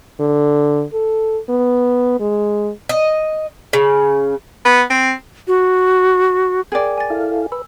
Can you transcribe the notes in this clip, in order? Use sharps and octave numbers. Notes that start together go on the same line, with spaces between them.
D3
A4
B3
G#3
D#5
C#3
B3
C4
F#4
G#4 A#4 D5 G5 G#6
G#5 A6
E4 A4 F5
B4 E6